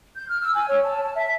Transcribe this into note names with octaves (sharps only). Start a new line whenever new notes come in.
G6
F6
E6
G#5
C#5
A5
A5
E5